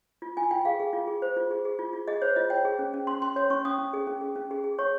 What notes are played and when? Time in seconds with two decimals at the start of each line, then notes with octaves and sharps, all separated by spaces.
0.22 F4
0.37 F4 G#5
0.51 F4 G5
0.65 G#4 F5
0.80 G#4
0.93 F4
1.08 G#4
1.22 C5
1.37 F4
1.51 G#4
1.65 G#4
1.79 F4
1.93 F4
2.07 G#4 D#5
2.22 C5 C#5
2.36 F4 D#5
2.50 C#5 G5
2.65 G#4
2.79 C#4
2.94 C#4
3.07 C#4 C6
3.22 C#4 C6
3.36 C#5 C6
3.50 C#4 C#6
3.65 C#4 D#6
3.78 C#4
3.93 G#4
4.07 C#4
4.21 G#4
4.36 C#4
4.51 G#4
4.64 G#4
4.79 C#5 C#6